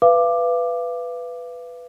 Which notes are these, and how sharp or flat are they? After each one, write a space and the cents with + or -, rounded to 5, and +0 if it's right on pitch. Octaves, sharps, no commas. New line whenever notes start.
B4 +5 F5 -40 D6 +10